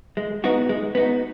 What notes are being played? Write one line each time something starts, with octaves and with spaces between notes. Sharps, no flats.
G#3
B3 D#4 F#4
G#3
B3 D#4 F#4